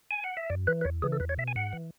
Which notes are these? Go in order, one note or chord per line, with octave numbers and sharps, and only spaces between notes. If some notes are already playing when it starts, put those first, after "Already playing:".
G#5
F#5
E5
F#2 D5
E3 B4
B4
E2 C#5
C#3 E3 G#4
A4
E2 B4
C#5
B2 E5
G#5
G#2 F#5
E3